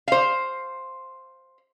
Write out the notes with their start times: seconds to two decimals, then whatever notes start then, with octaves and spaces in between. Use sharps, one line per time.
0.08 C5 F5